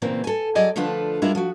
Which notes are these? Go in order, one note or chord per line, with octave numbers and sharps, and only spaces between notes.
A#2 C#3 E3 A#3 C4
A4 G#5
F#3 G#3 G#4 D5 D#5 G#5
D3 F3 A3 D4 F4 B4
G3 G#3 D4 E4 F4 A#4
F3 F#4